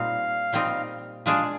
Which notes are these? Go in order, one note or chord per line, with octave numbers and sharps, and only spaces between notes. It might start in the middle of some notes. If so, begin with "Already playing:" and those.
Already playing: A#2 G3 C4 D#4 F5
A#2 G3 C4 D#4
A#2 G#3 D4 G#4 F5